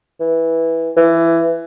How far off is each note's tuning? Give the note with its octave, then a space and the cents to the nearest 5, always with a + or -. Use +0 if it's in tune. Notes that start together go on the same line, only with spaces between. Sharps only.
E3 -5
E3 +15